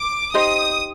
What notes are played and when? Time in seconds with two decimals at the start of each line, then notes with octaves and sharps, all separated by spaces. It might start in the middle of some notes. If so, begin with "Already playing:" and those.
Already playing: D6
0.34 D#4 G4 C5 D#5 D#6